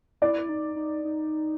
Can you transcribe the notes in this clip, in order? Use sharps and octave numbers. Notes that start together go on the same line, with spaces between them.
E4 D5
D#4
D#4
D#4